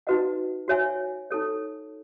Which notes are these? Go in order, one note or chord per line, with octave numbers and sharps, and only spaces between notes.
D#4 F#4 B4 D#5 F#5
F#4 C#5 E5 G#5
D#4 A4 C#5